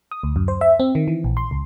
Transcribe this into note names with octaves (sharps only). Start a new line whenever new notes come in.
D#6
D2
F#2
C5
E5
C4
D#3
E3
A#1
C6
C#2